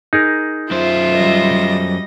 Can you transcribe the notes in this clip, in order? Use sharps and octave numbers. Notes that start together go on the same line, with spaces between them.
D#4 G#4 A#4
F#2 F4 C5 E5
G3 D#5